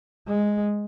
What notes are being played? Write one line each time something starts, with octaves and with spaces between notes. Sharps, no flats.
G#3